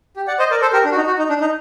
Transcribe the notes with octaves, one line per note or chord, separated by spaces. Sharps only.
G4
D5 F#5
C5 D#5
A#4 D5
A4 C5
G4 A#4
D4
F#4
D#4
F#4
D#4
D4
D#4